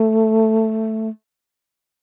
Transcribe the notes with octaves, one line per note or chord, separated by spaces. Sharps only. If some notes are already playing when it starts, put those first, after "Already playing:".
Already playing: A3